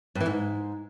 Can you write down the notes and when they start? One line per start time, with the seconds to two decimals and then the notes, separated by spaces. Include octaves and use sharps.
0.15 G2
0.21 E3
0.26 G#2